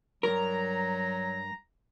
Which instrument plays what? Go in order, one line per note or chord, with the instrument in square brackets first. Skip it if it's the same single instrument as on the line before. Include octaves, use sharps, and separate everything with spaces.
[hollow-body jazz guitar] G2 A#4 [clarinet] F#3 [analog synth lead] A#5